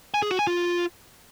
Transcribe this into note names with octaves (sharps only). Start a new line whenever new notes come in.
G#5
G#4
F#4
G#5
F4